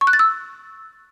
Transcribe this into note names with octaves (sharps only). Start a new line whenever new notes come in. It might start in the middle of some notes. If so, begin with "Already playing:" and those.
C#6
F#6
A6
E6